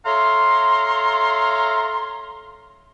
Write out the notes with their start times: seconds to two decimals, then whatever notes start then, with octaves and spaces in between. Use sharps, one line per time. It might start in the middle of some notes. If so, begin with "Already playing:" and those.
0.05 A4 C#5 E5 F5 A#5 C6